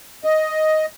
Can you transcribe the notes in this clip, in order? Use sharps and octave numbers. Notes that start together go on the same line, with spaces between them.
D#5